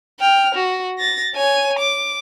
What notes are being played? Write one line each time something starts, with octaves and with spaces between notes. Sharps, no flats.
G5 F6
F#4
A6 A#6
C#5 G#5
D6